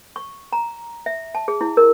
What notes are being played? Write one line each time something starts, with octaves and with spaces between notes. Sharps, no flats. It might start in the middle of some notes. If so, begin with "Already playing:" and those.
C#6
A#5
E5
A5
G#4
E4
A#4